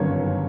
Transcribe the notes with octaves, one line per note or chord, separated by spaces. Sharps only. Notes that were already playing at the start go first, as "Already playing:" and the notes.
Already playing: G1 F#2 D#3 C#5